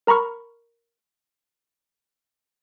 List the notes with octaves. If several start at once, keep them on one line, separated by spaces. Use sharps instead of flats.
A#4 A#5 B5 C#6 F6